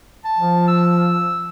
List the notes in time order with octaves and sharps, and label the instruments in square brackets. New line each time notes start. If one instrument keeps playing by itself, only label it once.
[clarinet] A5
[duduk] F3
[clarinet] E6